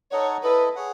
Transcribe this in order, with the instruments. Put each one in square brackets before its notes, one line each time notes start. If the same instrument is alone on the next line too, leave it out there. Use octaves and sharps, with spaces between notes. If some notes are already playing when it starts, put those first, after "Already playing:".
[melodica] D#4 A4 D#5 F#5 [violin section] C#5
[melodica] E4 A4 D#5 [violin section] B4
[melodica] G#4 C#5 F#5